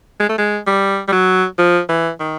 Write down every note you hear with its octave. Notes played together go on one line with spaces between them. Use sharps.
G#3
A3
G#3
G3
G3
F#3
F3
E3
D#3